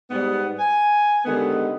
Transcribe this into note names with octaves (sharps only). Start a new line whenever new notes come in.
G#2 G3 B3
G#5
D3 D#3 G3 G#3 B3